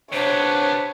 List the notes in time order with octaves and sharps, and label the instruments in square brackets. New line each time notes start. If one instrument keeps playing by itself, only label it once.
[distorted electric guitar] C3 B3 [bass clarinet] D4 [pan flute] C5 [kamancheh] C#5